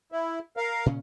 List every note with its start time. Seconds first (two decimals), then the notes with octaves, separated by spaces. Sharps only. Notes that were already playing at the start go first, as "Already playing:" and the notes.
0.12 E4
0.57 A#4 F5
0.86 A#2 C#3 C#4